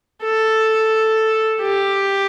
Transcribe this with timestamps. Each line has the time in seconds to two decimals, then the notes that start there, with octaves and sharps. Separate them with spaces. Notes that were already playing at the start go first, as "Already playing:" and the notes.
0.23 A4
1.61 G4